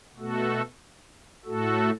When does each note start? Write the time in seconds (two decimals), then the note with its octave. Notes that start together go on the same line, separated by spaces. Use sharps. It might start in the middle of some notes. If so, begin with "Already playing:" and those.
0.17 B2 A3 F#4 A4
1.45 A2 A3 F#4 A4